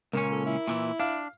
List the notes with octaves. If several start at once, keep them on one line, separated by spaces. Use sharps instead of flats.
C#2 A#2 A#3 C#4
A4
E4
A#2 D#3 E3
D4 F5